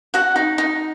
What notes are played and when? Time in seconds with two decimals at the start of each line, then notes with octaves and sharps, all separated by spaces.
0.14 F#4 F#5
0.36 D#4
0.58 D#4